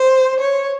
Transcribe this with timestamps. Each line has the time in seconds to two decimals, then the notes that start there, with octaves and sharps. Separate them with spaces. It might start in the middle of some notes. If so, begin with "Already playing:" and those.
Already playing: C5
0.39 C#5